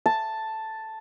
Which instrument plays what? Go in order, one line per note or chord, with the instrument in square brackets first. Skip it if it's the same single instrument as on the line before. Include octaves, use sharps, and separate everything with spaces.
[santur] A5